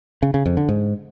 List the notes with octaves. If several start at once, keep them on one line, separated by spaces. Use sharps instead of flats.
C#3
C#3
F2
D3
G#2